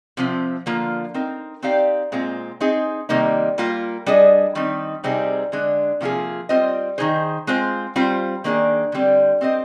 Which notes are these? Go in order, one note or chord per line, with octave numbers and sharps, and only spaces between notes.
C3 F3 C4
D3 F3 A#3 F4
C4 D#4 A#4
C4 D#4 G4 D5 F5
A#2 G#3 C4 F4
C4 D#4 G#4
C3 D#3 G3 A#3 D#4
G3 A#3 F4 A#4
G3 D4 G#4 D#5
D#3 G3 C4 D#4
C3 G3 C4 D#4 G#4
D3 G#3 D4
C3 F3 A#3 F4 G#4
G3 C4 F4 C5 D#5
D#3 G#3 D#4 G#4 C5
G#3 C4 F4 C5
G3 C4 F4 C5
D#3 A#3 D4 G#4
D3 G3 C4
C4 G4 C5 D#5